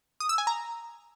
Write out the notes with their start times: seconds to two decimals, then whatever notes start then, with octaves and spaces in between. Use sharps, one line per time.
0.20 D#6
0.29 E6
0.38 G#5
0.47 A#5